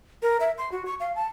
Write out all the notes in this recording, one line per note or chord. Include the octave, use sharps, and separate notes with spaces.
A#4
E5
C6
F#4
C#6
F5
A5